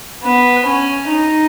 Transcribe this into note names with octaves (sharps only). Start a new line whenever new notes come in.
B3
C#4
D#4